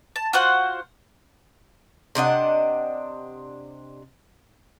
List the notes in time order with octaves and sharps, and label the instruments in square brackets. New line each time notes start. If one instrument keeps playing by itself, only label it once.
[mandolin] A5
F4 F#4 C5 F#5
[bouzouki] C3 D4 D#5 F#5